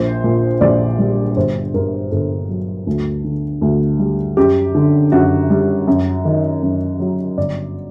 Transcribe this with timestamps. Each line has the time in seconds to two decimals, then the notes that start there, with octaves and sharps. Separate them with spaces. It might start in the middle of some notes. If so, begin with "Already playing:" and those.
Already playing: A#1 C5
0.24 A#2
0.61 A#1 D5
0.98 G3
1.36 G1 C5
1.74 G2 A#4
2.11 G1 A4
2.48 F#3
2.87 D2
3.24 D3
3.61 D2
3.99 G3
4.37 F#2 G4
4.75 D3
5.12 F#2 F#4
5.50 G3
5.87 F#2
6.25 D#3
6.62 F#2
7.00 F#3
7.37 G1 D5